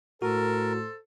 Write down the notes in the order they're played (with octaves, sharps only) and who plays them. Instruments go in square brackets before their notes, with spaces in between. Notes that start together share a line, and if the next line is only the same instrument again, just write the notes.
[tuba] A2 [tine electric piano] F#4 [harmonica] A4 C5 [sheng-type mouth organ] A#4